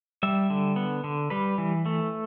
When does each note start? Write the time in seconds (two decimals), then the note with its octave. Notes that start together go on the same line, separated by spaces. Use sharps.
0.23 G3 E5
0.50 D3
0.76 B3
1.04 D3
1.30 G3 B4
1.58 E3
1.86 A3